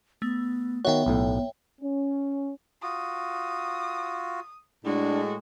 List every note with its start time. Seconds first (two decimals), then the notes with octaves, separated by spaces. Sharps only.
0.22 A3 B3
0.85 D#3 B3 F#4 C#5 E5 G5
1.06 B1 A2
1.82 C#4
2.82 F4 F#4 D#6
4.85 A2 G#3 D4 F#4